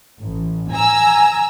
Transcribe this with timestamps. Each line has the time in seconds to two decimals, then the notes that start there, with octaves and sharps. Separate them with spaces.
0.21 A1
0.71 G#5 A#5 E6